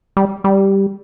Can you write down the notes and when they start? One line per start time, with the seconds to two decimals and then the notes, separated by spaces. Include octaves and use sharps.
0.17 G3
0.44 G3